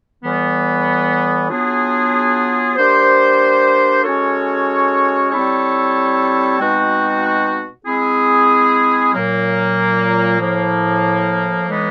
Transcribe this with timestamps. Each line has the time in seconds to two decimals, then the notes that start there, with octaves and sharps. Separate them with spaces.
0.23 A2 E3 G3 B3
1.49 F#3 B3 D4 F4 G#4
2.76 G3 A#3 D4 G4 C5
4.03 G#3 C#4 F#4 A4 C#5
5.30 G3 C4 E4 A4 C#5
6.58 B2 G#3 C4 D#4 F#4
7.85 G#3 C4 E4 G#4
9.13 A#2 F#3 A#3
10.39 A2 F3 A#3
11.66 A2 E3 G#3 B3 D#4